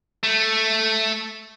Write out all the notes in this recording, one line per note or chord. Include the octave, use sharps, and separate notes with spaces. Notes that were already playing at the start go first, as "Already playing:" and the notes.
A3